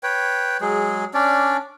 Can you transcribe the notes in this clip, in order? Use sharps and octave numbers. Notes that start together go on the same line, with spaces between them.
B4 C#5 G5
F#3 G#3 G#4
C#4 D4 D5